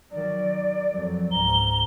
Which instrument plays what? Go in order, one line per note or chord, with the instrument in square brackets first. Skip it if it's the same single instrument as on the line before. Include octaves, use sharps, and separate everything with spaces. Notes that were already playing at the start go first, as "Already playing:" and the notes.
[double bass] D#3 F#3 [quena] D5
[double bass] F2 F#3
[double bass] C#2 G#2 [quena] A#5 [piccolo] G7